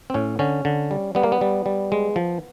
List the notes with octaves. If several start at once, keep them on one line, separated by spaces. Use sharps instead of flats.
C4
A2 C#4
D3 C#4
D3
G3
G3 B3
A#3
B3
G3
G3
G#3
F3